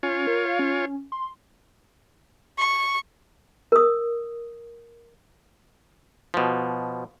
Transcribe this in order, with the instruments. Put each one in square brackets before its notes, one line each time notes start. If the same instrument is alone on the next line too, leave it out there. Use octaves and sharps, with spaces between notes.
[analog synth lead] C#4 [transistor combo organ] F4 C#5
[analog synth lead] A#4
F5
C#4
C6
[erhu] C#6
[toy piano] A#4 D#6
[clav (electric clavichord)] B2 F3